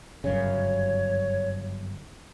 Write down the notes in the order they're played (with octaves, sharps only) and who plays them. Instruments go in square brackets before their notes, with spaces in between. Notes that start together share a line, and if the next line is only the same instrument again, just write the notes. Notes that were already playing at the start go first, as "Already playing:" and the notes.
[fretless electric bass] G1 F#2 C#3 [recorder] C#5